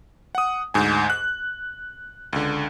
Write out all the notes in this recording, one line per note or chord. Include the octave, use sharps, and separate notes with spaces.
F#5 D#6
D2 G#2 G#5
F#6
C#2 D3